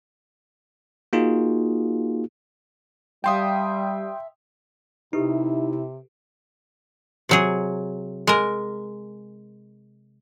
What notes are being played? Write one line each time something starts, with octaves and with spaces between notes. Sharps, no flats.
A#3 D#4 F4 F#4 G#4
G3 E5 F5 G5 A5 C6 D#6
C3 D#4 E4 G4 A4 B4
C3 F#3 G#4
G#3 A#4